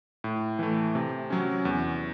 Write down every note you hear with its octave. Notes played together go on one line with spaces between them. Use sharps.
A2
E3 A3
C3
F#3 C#4
E2